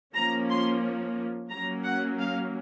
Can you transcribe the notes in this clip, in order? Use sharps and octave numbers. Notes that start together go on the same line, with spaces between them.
F3 A#3 C#4 A#5
C6
F#3 A#3 C#4 A#5
F#5
F5